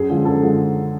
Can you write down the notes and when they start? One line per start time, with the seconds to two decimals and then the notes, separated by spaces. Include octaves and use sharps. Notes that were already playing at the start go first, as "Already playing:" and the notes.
Already playing: F#2 G#4
0.10 D3 F3 G#3
0.25 F#2 A4
0.42 D3 F3 G#3